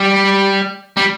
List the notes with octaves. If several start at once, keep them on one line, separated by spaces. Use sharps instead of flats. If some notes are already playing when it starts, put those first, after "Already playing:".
Already playing: G3
G3